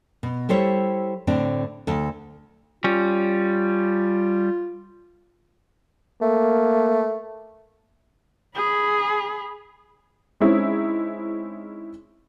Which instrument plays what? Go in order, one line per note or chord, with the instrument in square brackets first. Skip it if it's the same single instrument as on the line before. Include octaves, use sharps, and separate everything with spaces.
[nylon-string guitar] B2
G3 E4 A4 C5 C#5
A2 D3 C4 D4
D2 A4
[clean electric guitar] G3 C#4 [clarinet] F4
[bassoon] A3 [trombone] A#3
[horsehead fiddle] G#4 B5
[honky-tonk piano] G#3 C4 C#4 D#4 E4 G#4